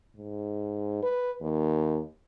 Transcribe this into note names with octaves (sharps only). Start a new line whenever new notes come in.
G#2
B4
D#2